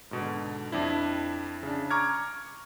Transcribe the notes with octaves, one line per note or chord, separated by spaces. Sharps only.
G#2 B2 D3
F2 D4 E4
C#3 D4
A#5 C#6 D6 F6 G#6